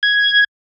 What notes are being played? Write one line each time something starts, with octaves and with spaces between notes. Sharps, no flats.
G#6